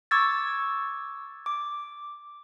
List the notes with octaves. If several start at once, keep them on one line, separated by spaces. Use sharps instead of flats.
C#6 D6 E6 G#6 A6
D6